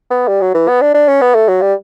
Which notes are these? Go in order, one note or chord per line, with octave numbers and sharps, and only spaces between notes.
B3
G3
F#3
E3
B3
D4
D4
C#4
B3
A3
F#3
G3